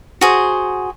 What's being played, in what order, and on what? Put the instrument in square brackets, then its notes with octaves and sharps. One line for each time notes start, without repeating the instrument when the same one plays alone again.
[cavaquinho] F#4 G#4 C5